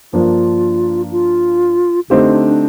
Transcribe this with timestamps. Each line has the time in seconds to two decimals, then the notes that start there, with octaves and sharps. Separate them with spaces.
0.13 G2 F3 A#3 D4 F4
1.12 F4
2.10 D3 A3 C4 D4 D#4 G4